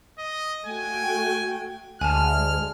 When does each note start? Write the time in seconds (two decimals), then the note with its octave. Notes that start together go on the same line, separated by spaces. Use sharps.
0.19 D#5
0.66 A3 F#4 G5 G#5
2.01 D2 G#3 G#5 A5 F6